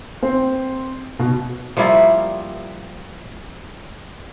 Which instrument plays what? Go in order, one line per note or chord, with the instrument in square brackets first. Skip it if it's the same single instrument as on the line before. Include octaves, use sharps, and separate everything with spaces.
[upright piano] C4
B2
[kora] F3 G3 A#3 E4